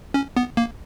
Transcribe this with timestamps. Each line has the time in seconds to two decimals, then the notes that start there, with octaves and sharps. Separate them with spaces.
0.14 C#4
0.37 B3
0.57 A#3